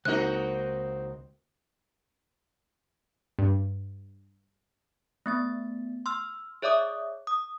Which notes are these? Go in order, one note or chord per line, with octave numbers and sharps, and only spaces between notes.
C#2 A#3 C4 D#4 F#4 F#6
G2
A3 B3 A6
C6 E6 F6
G#4 C#5 D5 E5 D6 D#6
D#6